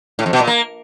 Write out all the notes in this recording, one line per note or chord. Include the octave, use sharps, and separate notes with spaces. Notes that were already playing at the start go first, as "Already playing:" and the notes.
A2
F2
B2
A#2
A#3